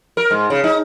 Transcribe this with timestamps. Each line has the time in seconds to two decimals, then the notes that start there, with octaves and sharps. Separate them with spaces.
0.17 A#4
0.31 G#2
0.50 C#3
0.64 D#4